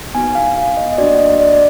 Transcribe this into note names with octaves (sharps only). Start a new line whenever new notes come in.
B3 D#4 F#4 G#5
F5
F5
D#5
D#5
A#3 D4 F#4 D5
D#5
D5
D5